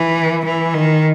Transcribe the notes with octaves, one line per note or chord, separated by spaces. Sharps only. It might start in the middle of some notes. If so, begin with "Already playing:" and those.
Already playing: E3
E3
D#3